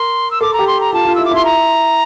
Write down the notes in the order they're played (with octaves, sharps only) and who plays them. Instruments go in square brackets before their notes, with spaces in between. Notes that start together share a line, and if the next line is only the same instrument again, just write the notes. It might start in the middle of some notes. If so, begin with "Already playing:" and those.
Already playing: [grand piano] A#4 [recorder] C6
[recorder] E6
[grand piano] A4 [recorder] D6
[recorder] A#5
[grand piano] G4
[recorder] C6
A#5
[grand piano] F4 [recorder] A5
[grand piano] F4
[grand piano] E4 [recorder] E6
[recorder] D6
[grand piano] E4 [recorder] C6
[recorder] A#5